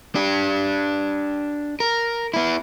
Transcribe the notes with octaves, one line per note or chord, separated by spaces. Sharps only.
D4 G4
A#4
B3 E4